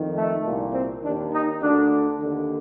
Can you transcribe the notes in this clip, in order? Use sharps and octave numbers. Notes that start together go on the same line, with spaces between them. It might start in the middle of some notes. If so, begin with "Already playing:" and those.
Already playing: F2 D#3
A3
C2 A#2
C4
D#2 D#3 D4
D#4
D2 D3 D4
D#2 D3